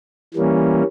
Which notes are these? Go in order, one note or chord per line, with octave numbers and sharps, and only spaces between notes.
E3 G3 A#3 C#4